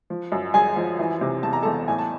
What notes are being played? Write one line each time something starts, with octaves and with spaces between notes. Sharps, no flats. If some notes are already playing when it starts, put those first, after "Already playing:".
F3
F#2
F#2 G#4 G#5
F3
E3
C3
E2 A5
A#5
E2 A4 A5
A2 G#5
A5